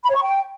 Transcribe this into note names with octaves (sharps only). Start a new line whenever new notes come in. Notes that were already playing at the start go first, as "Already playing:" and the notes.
B5
C#5
C#6
G5